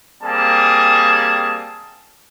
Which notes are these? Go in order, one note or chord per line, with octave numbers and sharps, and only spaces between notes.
G3 A#3 C4 G#4 A5